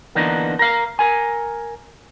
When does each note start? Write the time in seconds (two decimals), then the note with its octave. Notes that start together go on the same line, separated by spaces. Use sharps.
0.15 D3 E3 A#3 B3 D4 D#4
0.59 A#4 F5
0.99 A#4 G#5